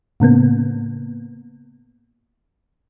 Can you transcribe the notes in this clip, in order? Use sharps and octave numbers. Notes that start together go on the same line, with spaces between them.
A2 C#3 A#3 B3